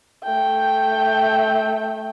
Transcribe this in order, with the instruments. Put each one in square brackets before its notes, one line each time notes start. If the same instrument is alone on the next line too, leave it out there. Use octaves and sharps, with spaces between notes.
[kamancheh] A3 G5